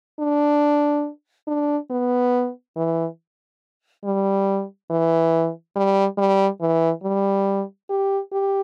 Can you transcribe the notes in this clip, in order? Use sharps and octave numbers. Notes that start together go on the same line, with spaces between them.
D4
D4
B3
E3
G3
E3
G3
G3
E3
G3
G4
G4